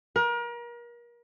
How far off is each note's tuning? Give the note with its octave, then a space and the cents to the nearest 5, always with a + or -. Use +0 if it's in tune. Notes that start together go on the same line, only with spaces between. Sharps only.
A#4 +35